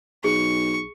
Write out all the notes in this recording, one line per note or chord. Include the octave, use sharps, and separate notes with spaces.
B1 G#4 C#6